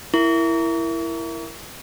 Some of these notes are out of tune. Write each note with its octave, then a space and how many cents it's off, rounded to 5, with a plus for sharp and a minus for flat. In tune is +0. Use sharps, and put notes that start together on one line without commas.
E4 +10 A#4 +0 C#6 +45